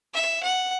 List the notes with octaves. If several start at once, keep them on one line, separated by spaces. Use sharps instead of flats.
E5
F#5